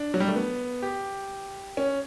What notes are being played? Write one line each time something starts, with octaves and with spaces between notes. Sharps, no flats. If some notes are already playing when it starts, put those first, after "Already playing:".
Already playing: D4
F#3
G3
A3
B3
G4
C#4